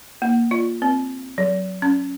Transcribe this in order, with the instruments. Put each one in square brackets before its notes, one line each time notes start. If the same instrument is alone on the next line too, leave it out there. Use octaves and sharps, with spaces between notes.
[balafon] A#3
F4
C4
F#3
C#4